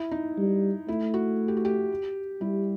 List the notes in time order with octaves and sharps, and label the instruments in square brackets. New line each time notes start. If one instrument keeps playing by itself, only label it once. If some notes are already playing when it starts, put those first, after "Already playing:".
Already playing: [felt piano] E4
D#4
[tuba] G3
[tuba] A3 [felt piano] E4
[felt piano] F#4
G4
F#4
G4
[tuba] G3 [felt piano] E4